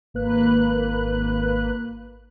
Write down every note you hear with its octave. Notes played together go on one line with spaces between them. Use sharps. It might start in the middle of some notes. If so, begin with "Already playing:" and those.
G#1 A#3 B4 F#6